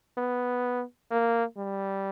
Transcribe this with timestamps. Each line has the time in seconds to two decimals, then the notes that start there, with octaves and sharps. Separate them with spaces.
0.17 B3
1.11 A#3
1.57 G3